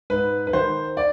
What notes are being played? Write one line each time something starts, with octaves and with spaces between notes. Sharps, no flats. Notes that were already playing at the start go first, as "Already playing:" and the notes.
G#2 B4
B4
D#3 C5
D5